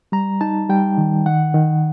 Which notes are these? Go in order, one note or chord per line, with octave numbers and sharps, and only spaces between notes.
G3 A#5
D#4 A5
G3 G5
D#3
D#3 F#5
D#3